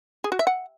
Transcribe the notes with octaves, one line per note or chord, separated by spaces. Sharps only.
G#4
F#4
E5
F#5